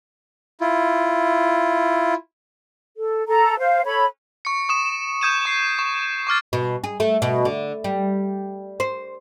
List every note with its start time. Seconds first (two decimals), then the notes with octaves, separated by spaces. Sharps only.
0.61 E4 F4
2.96 A4
3.27 A4 A#5
3.58 C5 F5
3.85 A4 C#5 B5
4.45 C#6 C#7
4.69 C#6 D#6 E7
5.21 D#6 G6 G#6 D#7 E7
5.45 C#6 C7
5.79 C#6
6.27 C#6 D6 F6 A6
6.53 B2
6.84 G#4
7.00 A3
7.22 B2
7.45 D3
7.84 G3
8.80 C5